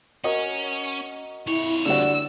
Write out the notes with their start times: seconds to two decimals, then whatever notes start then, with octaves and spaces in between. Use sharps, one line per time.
0.24 C#4 F#4 A#4 D#5
1.47 F2 E4 C#5
1.86 D3 G3 F#4 D5 E6